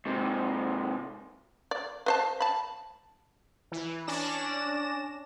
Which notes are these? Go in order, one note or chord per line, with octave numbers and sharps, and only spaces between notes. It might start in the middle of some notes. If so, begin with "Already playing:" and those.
G#2 C3
D5
B4 C5 A5
A5 B5
E3
C#4 D4 D5 A#6 E7